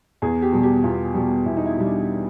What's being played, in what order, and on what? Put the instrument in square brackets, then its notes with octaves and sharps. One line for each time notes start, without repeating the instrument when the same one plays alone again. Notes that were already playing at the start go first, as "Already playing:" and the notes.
[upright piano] E2 G#4
G4
B2 G3
G4
E2 F4
B2 G3
E2 E4
D#4
E4
B2 G3
D4